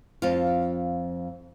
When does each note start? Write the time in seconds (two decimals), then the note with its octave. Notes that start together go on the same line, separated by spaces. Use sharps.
0.22 F2 F4